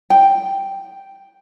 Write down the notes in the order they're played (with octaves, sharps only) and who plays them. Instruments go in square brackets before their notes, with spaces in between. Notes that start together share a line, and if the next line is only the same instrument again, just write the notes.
[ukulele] G5